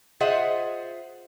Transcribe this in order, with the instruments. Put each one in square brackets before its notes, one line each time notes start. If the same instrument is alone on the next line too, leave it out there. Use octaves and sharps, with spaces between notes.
[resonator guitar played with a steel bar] F4 G#4 C5 D#5 E5 F#5